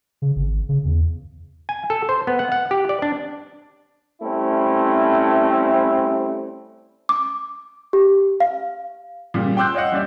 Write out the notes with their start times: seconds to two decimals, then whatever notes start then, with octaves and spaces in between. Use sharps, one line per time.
0.22 C#3
0.36 G#1
0.69 C#3
0.85 E2
1.69 G#5
1.90 A4
2.09 C5
2.27 B3
2.39 F#5
2.52 F#5
2.71 G4
2.89 D5
3.02 D4
4.22 G3 A3 C4 C#4 E4
7.09 D6
7.93 G4
8.40 F5
9.34 A#2 C#3 G3
9.57 G5 C6 D6 E6 F#6 G6
9.75 C#5 D#5 F5 F#5
9.92 G3 C#4 D5 E5